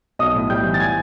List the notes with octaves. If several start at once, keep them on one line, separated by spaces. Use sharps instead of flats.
B1 D#5 D#6
A2
G3 G5 G6
E3
A6
G#5 G#6